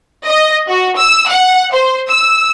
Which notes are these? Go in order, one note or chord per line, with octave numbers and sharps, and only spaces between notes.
D#5
F#4
E6
F#5
C5
E6